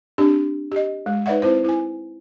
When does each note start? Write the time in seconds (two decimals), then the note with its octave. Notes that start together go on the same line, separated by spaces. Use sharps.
0.18 C4 D4 G4
0.72 G4 D#5
1.06 G#3
1.26 D#4 B4 C#5 D5 E5 F#5
1.42 C4 E4 C5
1.64 E4 G#5